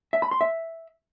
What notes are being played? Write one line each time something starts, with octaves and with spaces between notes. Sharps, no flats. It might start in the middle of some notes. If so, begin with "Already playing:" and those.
E5
B5
C6
E5